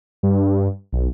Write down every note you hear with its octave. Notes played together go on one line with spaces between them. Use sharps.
G2
B1